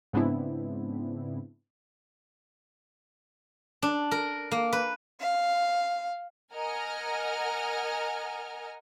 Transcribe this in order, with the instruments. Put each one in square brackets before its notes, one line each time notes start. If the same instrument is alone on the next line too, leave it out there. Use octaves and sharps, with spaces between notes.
[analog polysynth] G#2 C#3 B3 C4 D4 E4
[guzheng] D4
A#4
A#3
B4
[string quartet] F5
[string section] A#4 D#5 F#5 G#5 A#5 F6